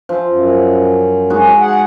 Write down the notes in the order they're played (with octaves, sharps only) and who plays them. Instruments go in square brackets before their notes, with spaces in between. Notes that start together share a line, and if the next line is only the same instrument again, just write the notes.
[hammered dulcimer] F3 E5
[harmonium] F#2
[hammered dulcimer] G#3 D#4 F#4
[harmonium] G#4 F#5